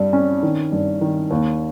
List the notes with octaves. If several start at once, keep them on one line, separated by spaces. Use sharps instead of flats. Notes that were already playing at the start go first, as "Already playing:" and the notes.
Already playing: G2 G3
C#4
D#3
G2
D#3
D#2